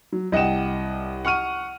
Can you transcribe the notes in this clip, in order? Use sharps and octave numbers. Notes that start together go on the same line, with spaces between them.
F#3
C2 D#5 F#5 G5 E7
F#5 C#6 F6 D#7